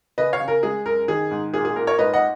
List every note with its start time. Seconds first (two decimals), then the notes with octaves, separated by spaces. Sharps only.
0.18 C#3 B4 D#5
0.33 C#5 F5
0.40 C#3
0.48 A#4
0.63 G#3 G#4
0.85 F#2 A#4
1.08 D#3 G#4
1.31 G#2
1.54 A#2 G#4
1.65 G#4
1.76 A#2 A#4
1.87 A#4 C#5
1.98 G#2 B4 D#5
2.13 D#5 F#5